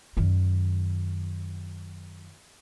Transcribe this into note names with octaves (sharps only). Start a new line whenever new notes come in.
F#2 D#3